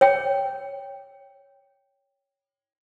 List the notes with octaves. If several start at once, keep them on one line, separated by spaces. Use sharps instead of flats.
C#5 G5